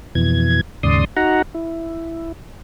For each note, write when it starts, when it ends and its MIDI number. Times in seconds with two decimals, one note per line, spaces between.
0.15 0.61 41
0.15 0.61 47
0.15 0.61 52
0.15 0.61 92
0.83 1.05 39
0.83 1.05 44
0.83 1.05 49
0.83 1.05 74
0.83 1.05 84
0.83 1.05 87
1.17 1.42 63
1.17 1.42 66
1.17 1.42 78
1.17 1.42 82
1.55 2.32 64